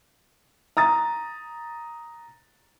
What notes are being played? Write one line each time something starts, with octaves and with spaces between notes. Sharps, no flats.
A#5 D#6 A6